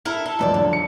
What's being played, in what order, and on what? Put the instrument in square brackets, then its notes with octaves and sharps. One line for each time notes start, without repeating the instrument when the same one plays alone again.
[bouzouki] E4 A4 A#4
A4
[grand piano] E2 F3 F#3 [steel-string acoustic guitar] G#2 C5 D5
[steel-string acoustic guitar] D3
[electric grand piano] C#7